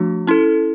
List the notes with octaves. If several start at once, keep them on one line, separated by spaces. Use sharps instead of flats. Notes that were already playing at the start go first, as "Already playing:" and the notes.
Already playing: F3 A3 D4 F#4
C#4 E4 A4